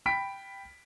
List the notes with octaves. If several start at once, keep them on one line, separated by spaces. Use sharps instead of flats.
G5 B5 B6 D7